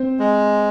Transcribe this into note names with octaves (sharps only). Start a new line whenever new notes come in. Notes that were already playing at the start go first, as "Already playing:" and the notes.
Already playing: C4 C5
G#3